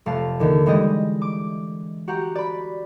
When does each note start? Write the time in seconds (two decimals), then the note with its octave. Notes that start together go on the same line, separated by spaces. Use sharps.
0.06 F1 A3 F5 A5
0.39 D#2 D3 E3
0.66 E3 G3 G#3 D#5
1.22 D6
2.08 F#4 G4 F#5 A#5
2.35 D5 B5